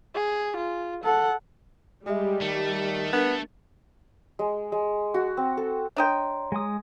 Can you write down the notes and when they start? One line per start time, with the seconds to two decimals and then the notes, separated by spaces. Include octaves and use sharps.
0.14 G#4
0.56 F4
1.04 A4 F#5
2.06 G3 G#3 G4 E5
2.42 D#3 A3
3.13 B3 D4 A#4
4.39 G#3
4.72 G#3
5.14 F#4
5.37 C4
5.57 A4
5.97 D4 C#5 D#5 G5 A#5 C6
6.52 G#3 D#6